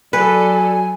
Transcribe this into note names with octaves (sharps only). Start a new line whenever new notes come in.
F#3 A4 B4 D5 G#5